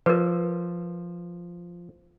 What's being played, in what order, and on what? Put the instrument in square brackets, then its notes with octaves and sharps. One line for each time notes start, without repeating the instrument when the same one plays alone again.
[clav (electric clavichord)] F3 [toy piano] A#4 B4